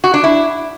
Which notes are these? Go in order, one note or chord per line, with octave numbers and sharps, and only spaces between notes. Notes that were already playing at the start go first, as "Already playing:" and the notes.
F#4
D4
E4